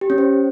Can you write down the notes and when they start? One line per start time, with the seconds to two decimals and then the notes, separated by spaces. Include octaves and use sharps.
0.01 G4
0.10 C#4
0.18 C5